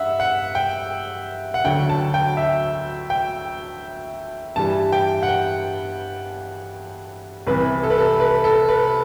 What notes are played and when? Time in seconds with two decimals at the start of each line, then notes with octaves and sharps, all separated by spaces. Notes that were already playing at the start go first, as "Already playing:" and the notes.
Already playing: G2 E5 F#5
0.20 F#5
0.55 G5
1.54 F#5
1.65 D2 D3 F#3 G5
1.89 A5
2.14 G5
2.37 E5
3.10 G5
4.56 G2 E3 G3 A5
4.92 G5
5.23 F#5
5.29 G5
7.47 C2 C3 E3 B4
7.83 A4
7.90 B4
7.98 A4
8.20 B4
8.44 A4
8.69 B4